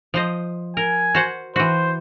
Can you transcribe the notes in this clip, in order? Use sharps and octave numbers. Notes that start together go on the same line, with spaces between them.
F3 C5 D#5
A#4 G#5
F#4 C5 F#5
E3 F#4 C5